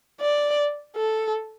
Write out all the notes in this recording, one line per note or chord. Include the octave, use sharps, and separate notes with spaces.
D5
A4